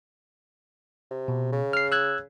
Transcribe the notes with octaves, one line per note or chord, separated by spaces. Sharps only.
C3
B2
C#3
F6 C7
E6 F#6 G#6